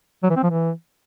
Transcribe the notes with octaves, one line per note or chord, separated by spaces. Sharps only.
F#3
E3
C4
F3
E3